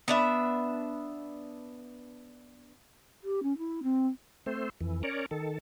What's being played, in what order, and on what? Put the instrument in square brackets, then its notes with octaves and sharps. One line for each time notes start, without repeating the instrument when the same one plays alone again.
[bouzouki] B3 D4 E5
[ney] G4
C#4
E4
C4
[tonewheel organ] A3 C4 C5
F2 E3
C#4 A#4 C#5 D5
D#3 A4